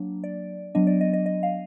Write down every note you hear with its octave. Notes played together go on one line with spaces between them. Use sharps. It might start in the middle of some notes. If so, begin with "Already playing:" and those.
Already playing: F#3 A#3 D4
D5
F#3 B3 D4 D#5
D5
D#5
D#5
D#5
F5